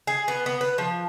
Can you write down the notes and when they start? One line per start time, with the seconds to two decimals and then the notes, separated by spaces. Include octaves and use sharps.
0.07 G#4
0.28 B3
0.46 B3
0.61 B4
0.78 F3